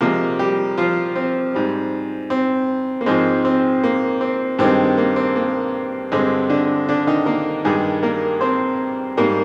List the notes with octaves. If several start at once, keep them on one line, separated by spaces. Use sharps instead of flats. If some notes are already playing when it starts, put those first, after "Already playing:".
C3 F3 G#3 A#3 A#4
G3 G4
F3 F4
C4
G#2 G3
C4
A#3
G#2 F3 G#3 C4
C4
A#3
C4
G2 D#3 G#3 C4
A#3
C4
A#3
G2 D3 G#3 C4
D3 D4
D3 D4
D#3 D#4
A#3 A#4
G2 D#3 G3 G#3 G#4
A#3 A#4
C4 C5
G#2 G3 A#3 A#4